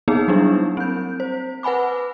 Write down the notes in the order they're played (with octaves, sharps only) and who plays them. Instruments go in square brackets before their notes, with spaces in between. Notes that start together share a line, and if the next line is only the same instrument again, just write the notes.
[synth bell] A#3 B3 D#4 G#4
F#3 G3 A#3 D4 E4
C4 G6
C5
B4 F#5 G#5 B5 D6